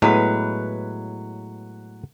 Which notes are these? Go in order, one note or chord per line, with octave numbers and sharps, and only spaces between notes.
A2 F#3 G#3 B3 B4